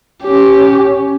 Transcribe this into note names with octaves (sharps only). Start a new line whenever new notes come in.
C#4 G4